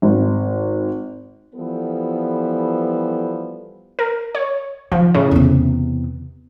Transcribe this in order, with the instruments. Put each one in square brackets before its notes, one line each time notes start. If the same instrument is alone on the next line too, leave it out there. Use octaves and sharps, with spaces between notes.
[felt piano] G#1
[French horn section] E3 F3 G3 B3 A4 B4
[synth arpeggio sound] A#4
C#5
[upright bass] D#3 [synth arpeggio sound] F3
[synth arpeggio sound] A2 C#3
[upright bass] E2 C3